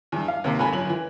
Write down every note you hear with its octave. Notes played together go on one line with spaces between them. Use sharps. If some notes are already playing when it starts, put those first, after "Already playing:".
E2 G2
F5
D#2 C3 A#3
D#2 G#2 C3 A4 G#5 B5
G1 F#2 G#5 F#7
E3